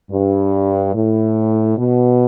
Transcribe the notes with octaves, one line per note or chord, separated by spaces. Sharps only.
G2
A2
B2